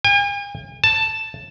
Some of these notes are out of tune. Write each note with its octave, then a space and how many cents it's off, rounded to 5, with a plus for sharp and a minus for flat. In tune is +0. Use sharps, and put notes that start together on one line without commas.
G#5 -45
A5 +5